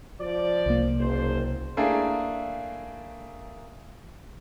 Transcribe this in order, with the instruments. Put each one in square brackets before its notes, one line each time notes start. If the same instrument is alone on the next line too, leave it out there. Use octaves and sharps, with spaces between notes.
[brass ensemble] F3 F4 D5
[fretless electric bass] C2 A#3
[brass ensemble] F#1 C5
[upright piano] A3 A#3 D4 E4 G#4